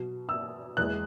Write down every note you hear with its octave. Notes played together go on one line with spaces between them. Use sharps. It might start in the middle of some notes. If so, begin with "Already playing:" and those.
Already playing: B2 F#3
E6
E2 E3 G#3 F#6